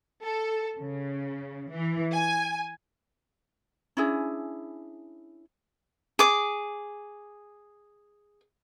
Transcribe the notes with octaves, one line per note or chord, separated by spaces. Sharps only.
A4
C#3
E3
G#5
C#4 D4 E4 G#4
G#4 D6